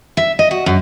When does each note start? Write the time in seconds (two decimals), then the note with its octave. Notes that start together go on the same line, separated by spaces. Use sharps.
0.17 E5
0.39 D#5
0.51 F#4
0.66 F#2